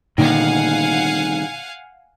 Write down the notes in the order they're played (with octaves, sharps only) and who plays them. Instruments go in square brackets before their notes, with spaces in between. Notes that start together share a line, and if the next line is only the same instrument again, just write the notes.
[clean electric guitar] C2 D#3 [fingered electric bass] A#2 D3 A#3 [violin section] F5 F#5 G#5